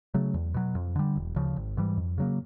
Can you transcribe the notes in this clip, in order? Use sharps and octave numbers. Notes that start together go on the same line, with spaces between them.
C#3 F#3 A3
E2
B2 F#3
F2
D3 G3
E1
D2 C#3 F3
G#1
G#2 E3 G3
F2
C#3 F#3 A#3